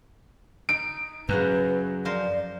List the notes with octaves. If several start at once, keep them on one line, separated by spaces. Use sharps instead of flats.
D#4 D7
F#2 C#3 B4 F#5 A#5
F3 A#4 C5 D5